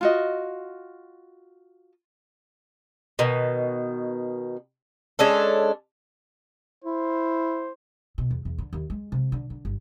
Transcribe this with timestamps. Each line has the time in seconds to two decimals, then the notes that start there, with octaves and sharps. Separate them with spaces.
0.01 F4 F#4 D#5
3.19 B2 D#3
5.19 G#3 C#4 D4 A4
6.84 E4 C5
8.18 B2
8.31 E2
8.45 E2
8.58 D3
8.73 D#2
8.90 G#3
9.12 C3
9.32 D3
9.50 D3
9.65 G1